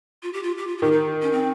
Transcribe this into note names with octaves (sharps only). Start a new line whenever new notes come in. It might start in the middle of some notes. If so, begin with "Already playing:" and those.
F4
G4
F4
G4
F4
F4
D#3 G4
D#4
C#4
C4